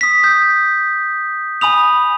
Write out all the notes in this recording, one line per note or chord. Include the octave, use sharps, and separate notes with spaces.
D#6 B6
D#6 G6
G#5 B5 D#6 F7